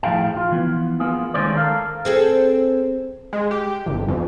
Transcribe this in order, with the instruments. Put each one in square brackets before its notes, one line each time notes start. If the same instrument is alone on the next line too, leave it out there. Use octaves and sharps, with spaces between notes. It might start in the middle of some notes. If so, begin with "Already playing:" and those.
[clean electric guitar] A2 F3 C#4 G#4 F5 G5
F4
E3 F3 B3
A#3 B3 F4 G#4
D#3 G#3 A3 C#4 C5 D5
A4 A#4 F5
[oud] C4 G#4 A4
[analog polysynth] G#3
G4
G1
F2